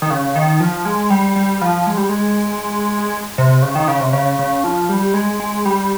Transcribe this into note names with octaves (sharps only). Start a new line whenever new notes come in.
D#3
C#3
D#3
F3
G#3
G3
G3
F3
G#3
G3
G#3
C3
C#3
D#3
C#3
C3
C#3
C#3
F3
G3
G#3
G#3
G3